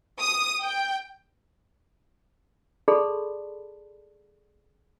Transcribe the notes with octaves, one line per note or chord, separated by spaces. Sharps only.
D#6
G5
G#4 A4 D5 A5 B5 C6